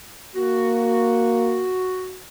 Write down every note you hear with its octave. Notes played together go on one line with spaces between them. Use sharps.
A#3 F#4